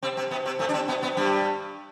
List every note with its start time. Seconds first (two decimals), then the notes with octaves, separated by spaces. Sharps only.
0.02 C3 C4
0.17 C3 C4
0.31 B2 B3
0.46 C3 C4
0.59 A2 A3
0.69 D4
0.73 C3 C4
0.88 B2 B3
1.02 B2 B3
1.17 G2 G3